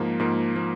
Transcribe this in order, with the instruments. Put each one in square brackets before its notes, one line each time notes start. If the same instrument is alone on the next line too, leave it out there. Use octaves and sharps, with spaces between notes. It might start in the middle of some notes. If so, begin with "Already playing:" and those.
Already playing: [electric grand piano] G#2 F3 A#3
G#2 F3 A#3
F3 A#3